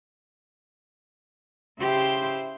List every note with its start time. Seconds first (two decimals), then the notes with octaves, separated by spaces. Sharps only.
1.79 C#3 E4 G4 C5 C6 G6